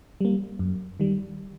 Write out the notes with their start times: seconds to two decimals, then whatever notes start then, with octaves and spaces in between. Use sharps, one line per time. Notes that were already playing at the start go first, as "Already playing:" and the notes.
0.21 G3 A#3
0.59 F#2
1.00 D#3 G3